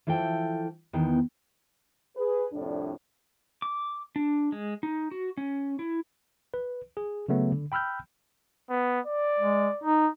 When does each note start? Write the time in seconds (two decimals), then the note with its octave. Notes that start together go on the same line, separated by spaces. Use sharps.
0.07 E3 F3 A4 E5 G5
0.93 E2 D#3 B3 G5
2.17 G#4 B4
2.53 C2 F2 A2 D4
3.62 D6
4.16 D4
4.52 G#3
4.83 D#4
5.11 F#4
5.37 C#4
5.79 E4
6.54 B4
6.97 G#4
7.28 C#3 F#3 A3 B3
7.52 D3
7.72 G5 B5 E6 F6 G6
8.70 B3
9.07 D5
9.39 G#3
9.84 D#4